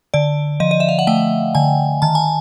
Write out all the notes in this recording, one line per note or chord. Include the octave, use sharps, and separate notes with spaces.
D3 D5
F3 D#5
D#5
E5
F5
F#5
A3 G5
D3 G#5
D#3 A5
G#5